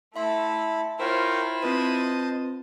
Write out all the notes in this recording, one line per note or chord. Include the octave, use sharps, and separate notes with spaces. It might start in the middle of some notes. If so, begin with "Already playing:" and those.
A3 E4 E5 A5 B5 C6
E4 F4 A#4 C5 C#5 G5
C4 F4 B4 C5 D#5 A5 D#7